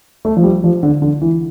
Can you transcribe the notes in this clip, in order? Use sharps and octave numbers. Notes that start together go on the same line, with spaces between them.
A3
F3
G3
F3
D3
D3
E3